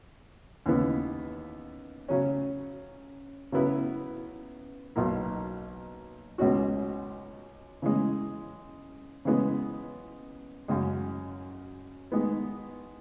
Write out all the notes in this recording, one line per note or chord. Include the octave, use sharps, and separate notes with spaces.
D#2 C#3 E3 B3
C#3 F#3 C#4
C#3 F#3 B3 E4 B4
B1 B2 A#3
C#2 B2 G#3 C#4 F#4
C#3 E3 G#3
C#3 E3 G#3 B3
F#2 C#3 G#3
D#3 G#3 B3